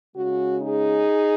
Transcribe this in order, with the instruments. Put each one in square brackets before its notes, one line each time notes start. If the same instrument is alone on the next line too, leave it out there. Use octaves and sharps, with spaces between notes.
[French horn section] C#3 G#3 C#4 F#4
D#4 G#4